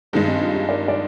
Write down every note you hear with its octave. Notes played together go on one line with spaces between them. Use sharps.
G2 D#3 G#3 A#3 D4
C4 D#4
D4 F4
D#4 G4
A#4 D5
D5